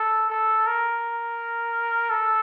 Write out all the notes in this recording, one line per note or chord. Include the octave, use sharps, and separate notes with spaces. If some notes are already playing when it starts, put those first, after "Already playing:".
Already playing: A4
A4
A#4
A4